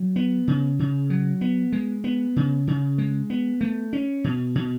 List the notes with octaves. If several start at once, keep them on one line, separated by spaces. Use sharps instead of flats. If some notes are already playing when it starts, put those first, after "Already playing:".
Already playing: F#3
B3
C#3
C#3
F#3
B3
G#3
B3
C#3
C#3
G#3
B3
A3
C#4
B2
B2